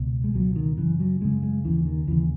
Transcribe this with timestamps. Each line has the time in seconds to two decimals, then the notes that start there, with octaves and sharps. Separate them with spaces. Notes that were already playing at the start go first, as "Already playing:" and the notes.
Already playing: C#2 B2
0.24 G#3
0.34 C#2 B2 F#3
0.56 D#3
0.77 F#2 C#3 E3
1.00 F#3
1.21 F#2 C#3 G#3
1.43 G#3
1.64 D#2 C#3 E3
1.85 D#3
2.07 D#2 C#3 E3